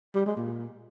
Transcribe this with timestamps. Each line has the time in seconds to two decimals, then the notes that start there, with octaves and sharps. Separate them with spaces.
0.15 G3
0.26 G#3
0.37 A#2